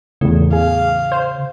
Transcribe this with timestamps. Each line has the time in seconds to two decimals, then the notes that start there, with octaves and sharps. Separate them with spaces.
0.21 E2 A2 C#3
0.53 G#4 F5
1.12 C5